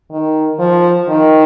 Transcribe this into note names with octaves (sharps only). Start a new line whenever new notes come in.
D#3
F3
D#3